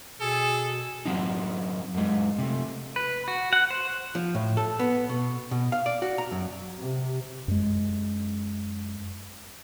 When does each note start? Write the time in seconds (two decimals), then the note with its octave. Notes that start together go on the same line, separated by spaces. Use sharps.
0.21 B2 G#4 A4
1.05 F#2 F#3 C4 D#4
1.95 F#2 G#3
2.38 C3 A3
2.96 B4
3.28 F#4
3.53 F#5
3.70 C5
4.15 F3
4.34 A2
4.57 A4
4.79 B3
5.09 B2
5.51 B2
5.72 F5
5.86 D5
6.02 F#4
6.18 A#5
6.32 F#2
6.79 C3
7.48 F#2 G#3